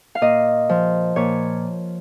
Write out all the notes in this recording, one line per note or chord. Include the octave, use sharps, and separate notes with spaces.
F5
A#2 D#5
F3
A#2 C#5